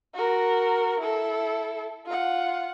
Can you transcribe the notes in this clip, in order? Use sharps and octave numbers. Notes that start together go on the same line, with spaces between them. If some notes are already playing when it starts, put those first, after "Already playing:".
F#4 A#4
E4 A4
F4 F#5